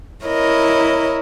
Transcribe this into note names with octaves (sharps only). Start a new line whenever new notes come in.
E4 A#4 C#5 D#5